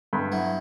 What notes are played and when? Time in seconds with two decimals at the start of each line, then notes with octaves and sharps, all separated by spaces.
0.13 G2
0.32 F#3 B3 E4